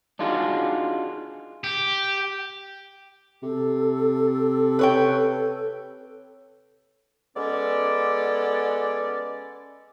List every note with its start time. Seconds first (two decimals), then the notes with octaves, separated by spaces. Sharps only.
0.19 D4 D#4 F4 F#4 G#4
1.64 G4
3.43 C3 A4
4.79 B4 C#5 G5
7.35 G#3 B3 C#4 A4 D5